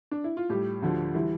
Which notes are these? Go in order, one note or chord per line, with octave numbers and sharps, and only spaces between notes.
D4
E4
F4
A2 G3 G4
D2 D3 F3
E3 G3 E4